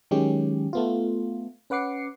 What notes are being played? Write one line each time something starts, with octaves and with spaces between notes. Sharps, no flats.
D#3 F#3 G#3 C#4 G4
A3 B3 F4
C#4 B4 F#5 D6 C7 C#7